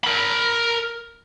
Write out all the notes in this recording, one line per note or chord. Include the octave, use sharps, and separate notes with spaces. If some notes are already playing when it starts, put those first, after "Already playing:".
A#4 B5